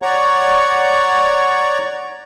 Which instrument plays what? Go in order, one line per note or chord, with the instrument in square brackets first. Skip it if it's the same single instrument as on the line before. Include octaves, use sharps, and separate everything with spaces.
[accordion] C#5 D5 F#5 A#5 C#6